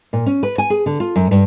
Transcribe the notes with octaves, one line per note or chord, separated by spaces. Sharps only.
A#2
C#4
B4
G#5
G#4
D3
F4
F#2
G2